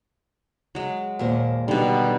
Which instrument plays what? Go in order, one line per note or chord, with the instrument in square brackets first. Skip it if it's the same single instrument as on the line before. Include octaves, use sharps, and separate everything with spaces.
[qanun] F#3 G#3
[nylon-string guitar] D#2 A#2 C5
[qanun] B2 D#3 [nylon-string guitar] D3 [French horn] G3